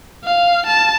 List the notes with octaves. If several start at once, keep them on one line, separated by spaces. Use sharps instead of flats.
F5
A5